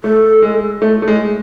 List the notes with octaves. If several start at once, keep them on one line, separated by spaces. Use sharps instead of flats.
A3 A4
G#3
A3
A3
G#3